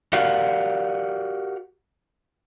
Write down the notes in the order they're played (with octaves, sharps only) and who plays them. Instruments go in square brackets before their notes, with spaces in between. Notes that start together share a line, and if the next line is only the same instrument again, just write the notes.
[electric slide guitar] F#4 G4 A#4 D5 F5 F#5